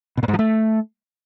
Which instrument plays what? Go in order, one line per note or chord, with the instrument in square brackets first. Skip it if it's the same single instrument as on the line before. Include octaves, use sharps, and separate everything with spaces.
[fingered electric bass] B2
A#2
G#2
F3
A3